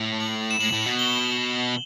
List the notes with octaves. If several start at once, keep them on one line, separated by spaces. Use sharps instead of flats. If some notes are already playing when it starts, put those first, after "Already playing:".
Already playing: A2
F#7
E7
A2 F#7
A2
B2
G7